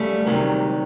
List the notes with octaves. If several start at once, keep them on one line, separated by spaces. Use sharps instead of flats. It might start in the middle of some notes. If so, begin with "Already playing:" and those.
Already playing: F#2 C#3 G3 A3
D2 C3 D#3 F#3